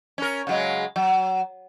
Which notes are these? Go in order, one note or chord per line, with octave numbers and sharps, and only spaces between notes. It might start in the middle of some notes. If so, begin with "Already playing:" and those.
C#4 A#4
C#3 F#3 G#3
F#3